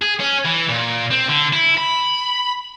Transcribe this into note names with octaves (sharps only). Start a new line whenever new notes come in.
G#4
C#4
E3
A#2
C4
D3
E4
B5